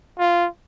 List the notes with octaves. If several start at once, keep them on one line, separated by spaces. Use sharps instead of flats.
F4